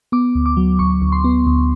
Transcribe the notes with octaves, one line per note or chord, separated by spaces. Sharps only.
B3 D6
D2
D6
F#3
D2 C#6
D2
C6
B3
D2